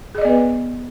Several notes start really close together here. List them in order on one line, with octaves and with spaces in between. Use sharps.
G#4 D#5 D5 B3 B4